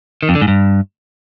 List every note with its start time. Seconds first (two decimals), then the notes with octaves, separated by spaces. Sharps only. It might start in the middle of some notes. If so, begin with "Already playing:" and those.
0.23 D#3
0.29 F2
0.35 D3
0.42 G#2
0.48 G2